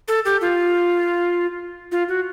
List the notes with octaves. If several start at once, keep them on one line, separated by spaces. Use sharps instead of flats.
A4
G4
F4
F4
F#4